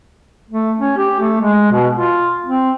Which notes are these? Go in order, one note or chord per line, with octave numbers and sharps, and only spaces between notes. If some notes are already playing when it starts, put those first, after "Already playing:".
A3
C#4
G4
A3
G#3
B2
F4
C4